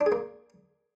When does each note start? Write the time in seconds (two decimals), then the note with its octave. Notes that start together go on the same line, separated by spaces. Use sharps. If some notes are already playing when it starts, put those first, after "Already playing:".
0.01 D4
0.06 G#4
0.12 A#3